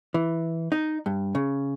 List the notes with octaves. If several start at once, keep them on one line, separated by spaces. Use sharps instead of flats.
E3
D#4
G2
C#3